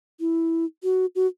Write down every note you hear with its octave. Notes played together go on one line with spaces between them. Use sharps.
E4
F#4
F#4